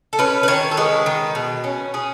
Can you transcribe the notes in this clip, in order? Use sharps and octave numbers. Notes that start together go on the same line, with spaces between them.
A4
C#4 B4
B4
D#3 C#5
A4
G#3 B4
D#3
B2
C#4
C#4 G#4